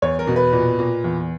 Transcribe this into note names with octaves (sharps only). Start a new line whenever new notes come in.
E2 C#5
A#4
B2
B4
A#2
A#2
E2